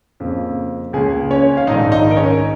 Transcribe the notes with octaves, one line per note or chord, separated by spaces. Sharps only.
F2 C#3 A#3
C#2 C#3 A#3 C#4 G#4
C#4 C#5
F5
A#1 G#2 D#3 D#4 D#5
D#4 D#5
A#4
C#4 C#5